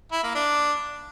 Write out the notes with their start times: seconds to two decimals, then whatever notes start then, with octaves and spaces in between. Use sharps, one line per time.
0.12 E4
0.23 A#3
0.35 D4